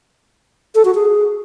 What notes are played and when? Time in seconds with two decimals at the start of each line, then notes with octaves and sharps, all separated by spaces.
0.75 A4
0.85 F#4
0.95 G#4